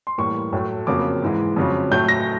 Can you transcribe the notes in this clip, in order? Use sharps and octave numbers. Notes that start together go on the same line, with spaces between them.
C6
A2 E3 G3 A#3 C#6
A2 F#3 A3
F2 C#3 F#3 A#3 D6
G#2 E3 G#3
F2 C#3 F#3
A2 F#3 A3 G6
A#6